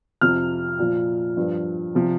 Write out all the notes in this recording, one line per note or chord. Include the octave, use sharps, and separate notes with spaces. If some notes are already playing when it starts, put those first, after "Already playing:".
F2 C3 F3 F6
A#2 F3
G2 F3
C3 F3